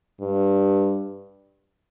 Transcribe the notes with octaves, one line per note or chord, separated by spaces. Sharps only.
G2